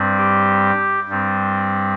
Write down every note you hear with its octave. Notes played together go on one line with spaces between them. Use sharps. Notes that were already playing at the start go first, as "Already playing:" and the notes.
Already playing: G2 G3 C4
G4
G2 G3 C4